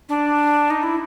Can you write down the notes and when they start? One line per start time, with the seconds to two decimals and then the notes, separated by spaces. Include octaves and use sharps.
0.09 D4
0.70 D#4
0.83 E4